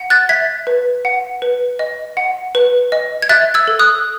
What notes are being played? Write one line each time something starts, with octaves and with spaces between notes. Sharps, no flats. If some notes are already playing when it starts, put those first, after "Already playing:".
Already playing: F#5
F#6 A6
E5 G#6 B6
B4
F#5
B4
D#5
F#5
B4
D#5
G#6
E5 F#6 A6
E6 G#6
A4
D#6 F#6